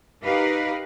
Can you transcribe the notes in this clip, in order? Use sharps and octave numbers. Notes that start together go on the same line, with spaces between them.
D#4 G4 A#4 B4 F5